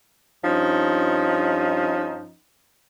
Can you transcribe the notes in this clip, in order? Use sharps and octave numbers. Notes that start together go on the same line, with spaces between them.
G2 F3 C#4 D#4